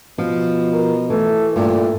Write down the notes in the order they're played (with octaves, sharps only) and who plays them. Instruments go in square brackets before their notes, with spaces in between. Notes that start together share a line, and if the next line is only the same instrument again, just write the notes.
[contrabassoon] B2 [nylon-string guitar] F3
[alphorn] A#4
[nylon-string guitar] E3 [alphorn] A3
[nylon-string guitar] G2 [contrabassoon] A#2 [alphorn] A3